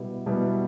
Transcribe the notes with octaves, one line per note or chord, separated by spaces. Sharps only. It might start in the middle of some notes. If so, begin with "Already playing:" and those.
Already playing: B2 G3 B3 E4
B2 G3 B3 E4